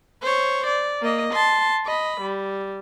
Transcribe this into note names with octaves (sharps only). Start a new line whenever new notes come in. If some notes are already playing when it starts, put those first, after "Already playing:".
C5 C#5
D5
A#3 D#5
A5 C6
D#5 B5
G3